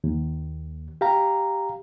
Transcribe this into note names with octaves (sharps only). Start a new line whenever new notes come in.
D#2
G4 F5 A#5